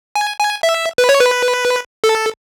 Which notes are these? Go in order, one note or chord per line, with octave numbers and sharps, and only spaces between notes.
G#5
G#5
E5
B4
C#5
B4
A4